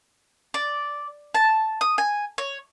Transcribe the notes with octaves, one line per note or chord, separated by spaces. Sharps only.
D5
A5
D#6
G#5
C#5